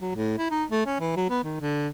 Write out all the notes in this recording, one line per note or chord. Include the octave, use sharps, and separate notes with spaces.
F#3
A2
E4
D#4
A3
C#4
E3
F#3
B3
D#3
D3